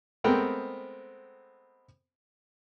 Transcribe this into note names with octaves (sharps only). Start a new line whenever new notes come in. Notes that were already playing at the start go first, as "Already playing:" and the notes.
G#3 A3 B3 C4 A#4 G5